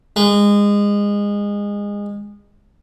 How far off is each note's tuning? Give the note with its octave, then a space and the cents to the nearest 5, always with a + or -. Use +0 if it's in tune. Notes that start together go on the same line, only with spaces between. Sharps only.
G#3 -25